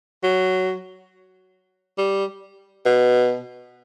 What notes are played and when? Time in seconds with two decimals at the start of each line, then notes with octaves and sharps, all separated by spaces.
0.23 F#3
1.98 G3
2.85 B2